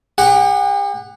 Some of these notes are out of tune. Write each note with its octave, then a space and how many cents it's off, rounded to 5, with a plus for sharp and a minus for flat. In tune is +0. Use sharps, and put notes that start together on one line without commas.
G4 +45 F#5 +0